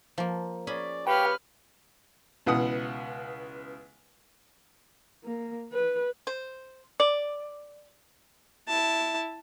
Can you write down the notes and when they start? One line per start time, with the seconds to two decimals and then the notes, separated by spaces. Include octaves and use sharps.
0.18 F3 A#3
0.67 C#4 G#4 D5 B5
1.07 G4 B4 C#5 F5 G5 F6
2.46 C#2 B2 E3 B4 F#5 D#6
5.24 A#3
5.72 B4
6.27 C5
7.00 D5
8.68 E4 A5